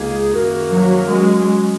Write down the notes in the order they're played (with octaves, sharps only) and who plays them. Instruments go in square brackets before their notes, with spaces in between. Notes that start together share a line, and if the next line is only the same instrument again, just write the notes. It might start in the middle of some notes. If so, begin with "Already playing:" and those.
Already playing: [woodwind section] C#2 C#3 A#3 D#4 G#4
F#2 D#3 A#3 F#4 A#4
[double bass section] F#3
[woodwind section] F#3 C#4 F#4 [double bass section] G#3